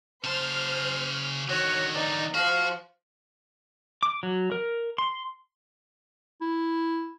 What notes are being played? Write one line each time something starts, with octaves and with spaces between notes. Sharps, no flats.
C#3 C5 A5 F6
D3 D#3 F#4 C#5
D#4 D5
F3 F#4 F5
D6
F#3
A#4
C6
E4